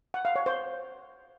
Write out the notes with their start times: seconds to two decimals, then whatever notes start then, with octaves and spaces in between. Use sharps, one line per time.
0.14 F#5
0.25 F5
0.36 C#5
0.46 C5